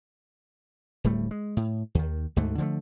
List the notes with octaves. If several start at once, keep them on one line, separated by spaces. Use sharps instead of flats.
D1 A2 G3 A3
G#3
A2
D#2 D#3
D2 G#2 D3 A3
D3 F3 G3 A3